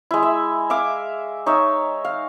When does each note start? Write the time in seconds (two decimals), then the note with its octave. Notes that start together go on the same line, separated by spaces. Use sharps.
0.11 G#3 E4
0.23 E5
0.70 E5 F5 D6
1.46 D#4 C#5 E5
2.05 F5